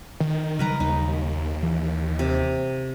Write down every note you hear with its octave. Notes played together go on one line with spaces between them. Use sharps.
D#3
C#3 F#3 G3 A#4 B4 A#5
D#2 D#4
E3
C3